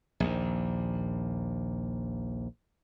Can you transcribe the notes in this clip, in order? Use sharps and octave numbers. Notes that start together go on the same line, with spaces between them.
A#1 D#2